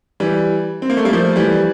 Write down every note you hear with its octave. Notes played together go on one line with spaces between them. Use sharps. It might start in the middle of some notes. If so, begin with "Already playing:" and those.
E3 G3
C4
A#3
A3
G3 A#3
F3 A3
E3 G3